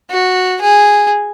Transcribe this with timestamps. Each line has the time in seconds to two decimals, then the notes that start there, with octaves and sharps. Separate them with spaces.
0.10 F#4
0.61 G#4